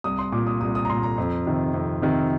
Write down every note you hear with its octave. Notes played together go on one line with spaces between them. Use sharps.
C2 D#6
C6
A#2 D6
D#6
C2 D#6
D#6
A#5
A#2 C6
A#5
F2
C3 D#3
F2
C3 D#3